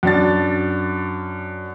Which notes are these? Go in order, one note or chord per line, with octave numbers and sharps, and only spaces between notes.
F#2 D4 A6